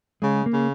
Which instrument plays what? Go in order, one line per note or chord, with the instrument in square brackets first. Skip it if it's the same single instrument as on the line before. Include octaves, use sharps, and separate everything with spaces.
[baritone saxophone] C#3 [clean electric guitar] G#3
[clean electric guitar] A#3
[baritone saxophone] C#3